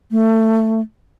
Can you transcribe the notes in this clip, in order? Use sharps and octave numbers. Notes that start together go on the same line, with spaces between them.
A3